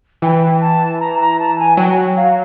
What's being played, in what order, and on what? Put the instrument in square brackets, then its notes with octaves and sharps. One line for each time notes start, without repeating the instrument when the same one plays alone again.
[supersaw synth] E3 [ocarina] G5
[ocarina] A5
A#5
A#5
A5
G#5
[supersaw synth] F#3 [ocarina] G5
[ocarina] F5